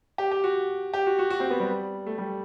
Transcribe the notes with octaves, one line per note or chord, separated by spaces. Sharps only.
G4
G4
F#4
G4
F#4
F#4
F#4
C4
B3
G3
A3
G3